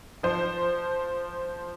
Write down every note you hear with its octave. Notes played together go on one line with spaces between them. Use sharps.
F3 C5